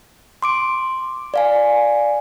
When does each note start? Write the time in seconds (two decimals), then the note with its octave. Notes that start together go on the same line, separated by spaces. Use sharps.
0.42 C6 D6 D7
1.34 D5 F5 G#5